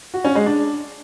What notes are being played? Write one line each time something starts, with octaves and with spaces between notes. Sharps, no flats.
F#4
C#4
G#3
D4